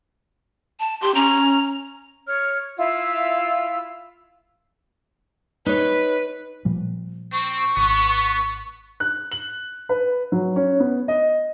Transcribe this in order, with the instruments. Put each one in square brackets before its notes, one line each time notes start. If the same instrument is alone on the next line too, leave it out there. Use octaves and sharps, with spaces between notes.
[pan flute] A5
[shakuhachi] G4 [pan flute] C6
[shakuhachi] C#4 [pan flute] A#5
[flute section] C#5 F6
E4 F4 E5 E6
[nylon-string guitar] D#4 C#5 [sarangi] B4
[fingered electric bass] A#2 F3 G3
[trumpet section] C4 [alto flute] C#6
[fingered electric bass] G#1 [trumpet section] B3
[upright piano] F#6
F#7
B4
F#3
C#4
B3
D#5